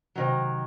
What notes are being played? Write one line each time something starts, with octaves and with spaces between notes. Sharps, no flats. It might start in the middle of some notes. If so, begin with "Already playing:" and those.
C3 D#3 F#3